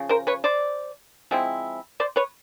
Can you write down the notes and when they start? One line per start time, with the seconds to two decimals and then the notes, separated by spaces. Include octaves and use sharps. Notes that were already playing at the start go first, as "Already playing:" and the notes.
Already playing: C#3 F3
0.09 A#4 C5
0.27 B4 C#5
0.44 C5 D5
1.31 F3 G#3 C4 E4
2.00 C5 D5
2.16 B4 C#5